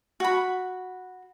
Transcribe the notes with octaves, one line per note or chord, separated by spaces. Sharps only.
F#4 B5